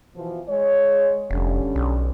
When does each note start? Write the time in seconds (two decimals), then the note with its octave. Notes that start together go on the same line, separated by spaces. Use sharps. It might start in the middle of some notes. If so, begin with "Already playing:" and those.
0.15 B2 E3 F3
0.48 G#3 C#5
1.31 F1 D3 G3 C#4
1.75 B1